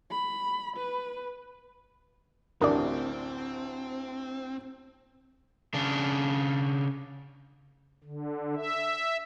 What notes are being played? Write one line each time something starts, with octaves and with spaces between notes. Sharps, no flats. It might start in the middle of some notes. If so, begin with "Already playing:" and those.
B5
B4
A1 D2 C4 A#4 D5 D#6
C#3 D4
D3
E5